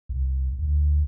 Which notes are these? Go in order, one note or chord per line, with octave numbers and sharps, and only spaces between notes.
C2
D2